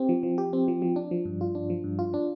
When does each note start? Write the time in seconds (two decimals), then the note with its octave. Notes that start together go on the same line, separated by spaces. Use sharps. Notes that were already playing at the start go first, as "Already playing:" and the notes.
Already playing: C4 G4
0.09 F3
0.23 F3
0.38 G4
0.53 C4
0.68 F3
0.82 F3
0.96 D4
1.11 F3
1.25 G2
1.41 F4
1.55 D4
1.70 F3
1.84 G2
1.99 F4
2.14 D4